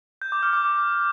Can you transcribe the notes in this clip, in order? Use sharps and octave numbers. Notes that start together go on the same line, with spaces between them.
G6
D6
F6
D6